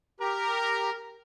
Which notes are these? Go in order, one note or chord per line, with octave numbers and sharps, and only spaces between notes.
G4 A#4 A#5